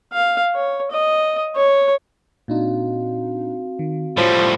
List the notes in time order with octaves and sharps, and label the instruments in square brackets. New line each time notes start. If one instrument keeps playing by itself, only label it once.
[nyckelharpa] F5
C#5
D#5
C#5
[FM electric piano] A#2 D4 D#4 [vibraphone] C4 F#4 F5
[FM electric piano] D#3
[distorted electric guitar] A2 G3 [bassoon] F3 [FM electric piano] C#5